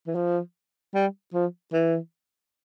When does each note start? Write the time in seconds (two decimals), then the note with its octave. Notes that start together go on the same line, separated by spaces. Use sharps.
0.07 E3
0.15 F3
0.94 G3
1.34 F3
1.73 E3